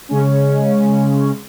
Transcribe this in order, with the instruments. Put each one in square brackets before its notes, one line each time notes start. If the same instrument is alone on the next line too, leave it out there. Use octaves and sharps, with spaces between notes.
[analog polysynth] C#3 G#3 C#4